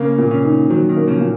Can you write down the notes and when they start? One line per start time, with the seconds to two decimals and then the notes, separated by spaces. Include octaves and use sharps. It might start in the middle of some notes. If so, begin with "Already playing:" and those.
Already playing: C#3 A#3
0.18 A#2
0.31 C#3
0.45 D#4
0.70 D#3 F#3
0.89 D#3
0.96 A#3
1.08 C#3 F3
1.20 A#2